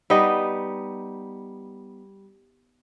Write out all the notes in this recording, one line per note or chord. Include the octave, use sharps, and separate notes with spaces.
G3 B3 D#4 D#5